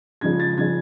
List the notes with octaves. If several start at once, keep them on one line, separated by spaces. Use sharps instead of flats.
C#3 F3 G#3 G#6
A6
C#3 F3 G#3 G#6